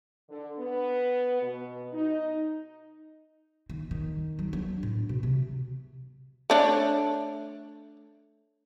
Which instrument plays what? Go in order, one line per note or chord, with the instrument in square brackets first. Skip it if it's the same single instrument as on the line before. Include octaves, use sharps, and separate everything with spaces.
[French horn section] D3
B3
B2
D#4
[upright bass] D#3
D#3
F#3
D4
A2
B2
C3
[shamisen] A3 D4 C#5